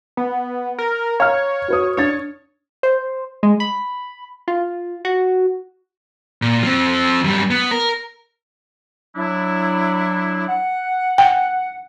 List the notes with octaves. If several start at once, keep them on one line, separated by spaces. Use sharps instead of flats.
B3
A#4
C#5 F5 A#5 F6
F#4 B4 D#6
D4 C#5 A6
C5
G#3
B5
F4
F#4
A#2
F3 C4
F#2 G3
B3
A#4
F#3 D4 E4
F#5
G5